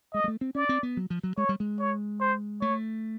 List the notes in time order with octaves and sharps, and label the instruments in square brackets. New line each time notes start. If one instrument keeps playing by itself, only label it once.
[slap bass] G#3 [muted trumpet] D#5
[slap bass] G#3
A3
C4
[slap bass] C#4 [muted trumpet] D5
[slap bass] C4
B3
F#3
F3
F#3
[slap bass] G#3 [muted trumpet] C#5
[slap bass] G3
G#3
[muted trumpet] C#5
C5
[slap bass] A3 [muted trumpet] C#5